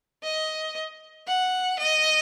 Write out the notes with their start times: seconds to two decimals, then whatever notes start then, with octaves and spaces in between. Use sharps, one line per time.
0.23 D#5
1.27 F#5
1.79 D#5